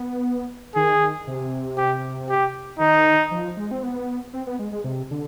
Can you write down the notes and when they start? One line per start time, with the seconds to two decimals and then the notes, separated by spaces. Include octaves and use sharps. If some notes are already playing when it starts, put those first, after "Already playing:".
Already playing: B3
0.75 D#3 G#4
1.27 C3
1.77 G4
2.30 G4
2.80 D#3 D#4
3.31 F3
3.57 G#3
3.71 C4
3.83 B3
4.33 C4
4.47 B3
4.59 G#3
4.72 G#3
4.84 C3
5.11 D3